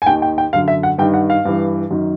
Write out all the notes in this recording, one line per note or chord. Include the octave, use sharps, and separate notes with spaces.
G#5
D#2 D#3 G5
G5
G5
F#2 D3 F5
E5
F#5
G2 D#3 G5
F#5
F5
G2 E3
F#2 D#3